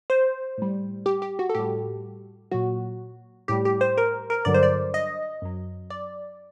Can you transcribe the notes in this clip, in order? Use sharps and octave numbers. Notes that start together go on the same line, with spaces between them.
C5
A2 G3
G4
G4
F#4
A4
A2 G3 G4
A#2 F#3 F#4
A2 G3 G4
G4
C5
A#4
A#4
G2 D3 F#3 D5
C5
D5
D#5
F#2 F#3
D5